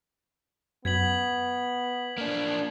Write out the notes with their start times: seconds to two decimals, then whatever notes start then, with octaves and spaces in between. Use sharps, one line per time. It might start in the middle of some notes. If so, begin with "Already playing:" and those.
0.85 F#2 B3 G#6 B6 F#7
2.18 A#3 D4